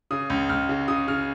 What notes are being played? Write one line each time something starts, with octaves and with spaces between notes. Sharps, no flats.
C#3 D#6
C#2
C#2 F6
C#3
C#3 D#6
C#3 F6